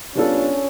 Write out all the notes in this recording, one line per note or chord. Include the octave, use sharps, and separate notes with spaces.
G3 B3 C#4 D4 F4 A4